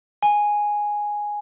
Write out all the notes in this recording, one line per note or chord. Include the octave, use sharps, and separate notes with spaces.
G#5